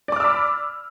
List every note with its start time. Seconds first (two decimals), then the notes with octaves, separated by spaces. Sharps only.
0.08 D5
0.12 D6
0.16 F6
0.20 E6
0.24 B5